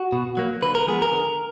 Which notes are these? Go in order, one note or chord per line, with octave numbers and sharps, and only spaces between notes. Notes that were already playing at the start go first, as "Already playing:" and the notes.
Already playing: F#4
B2
F#3 A#3
D3 B4
A#4
F3 G#3 B3 G#4
A#4
D3